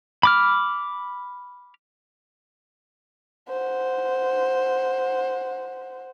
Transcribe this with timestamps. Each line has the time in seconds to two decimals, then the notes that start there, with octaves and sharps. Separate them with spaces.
0.23 B5 D6 F6
3.49 C5 F#5